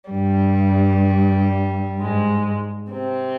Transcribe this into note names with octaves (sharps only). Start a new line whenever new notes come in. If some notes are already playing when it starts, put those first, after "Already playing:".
G2 G3
G#2 G#3
C3 C4